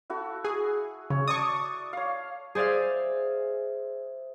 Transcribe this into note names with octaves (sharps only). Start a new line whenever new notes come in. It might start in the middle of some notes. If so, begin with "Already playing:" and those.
E4 F#4 A4
G#4
C#3 C#5
D5 A5 C#6 D#6
C#5 F5
G#4 C5 D5 E5 F5